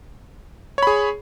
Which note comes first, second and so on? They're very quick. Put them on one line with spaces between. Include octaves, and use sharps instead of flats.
C#5 B5 G#4